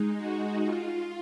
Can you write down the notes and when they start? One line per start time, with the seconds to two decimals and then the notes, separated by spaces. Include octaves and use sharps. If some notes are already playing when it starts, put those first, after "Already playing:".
Already playing: G#3 D#4
0.18 F#4
0.64 F4